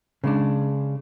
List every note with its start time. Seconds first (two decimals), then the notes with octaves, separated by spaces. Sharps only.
0.24 C#3 G#3 D4